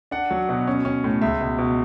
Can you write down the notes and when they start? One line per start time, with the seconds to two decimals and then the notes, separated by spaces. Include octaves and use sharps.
0.11 D4 F#5
0.31 F#3
0.49 B2
0.67 C#4
0.85 C#4
1.04 A2
1.22 C#2 E5
1.41 B2
1.58 B2